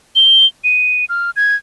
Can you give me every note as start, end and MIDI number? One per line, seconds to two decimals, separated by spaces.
0.16 0.46 103
0.64 1.05 99
1.09 1.30 89
1.36 1.56 92